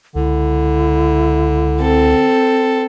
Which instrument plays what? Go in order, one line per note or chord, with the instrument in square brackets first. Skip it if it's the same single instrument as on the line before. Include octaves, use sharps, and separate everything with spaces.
[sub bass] C#2 [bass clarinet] D3 [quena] E4
[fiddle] C4 A4